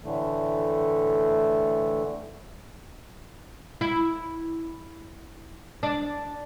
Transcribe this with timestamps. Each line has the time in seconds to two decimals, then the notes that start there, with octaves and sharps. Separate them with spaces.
0.05 A2 D3 E3 A3
3.81 E4
5.83 D4